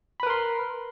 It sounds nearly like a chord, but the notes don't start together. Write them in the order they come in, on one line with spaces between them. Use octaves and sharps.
B5 B4 A#4 C6